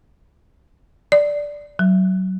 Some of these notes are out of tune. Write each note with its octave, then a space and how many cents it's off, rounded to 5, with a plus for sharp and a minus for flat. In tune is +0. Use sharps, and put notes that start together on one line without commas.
D5 -5
F#3 +20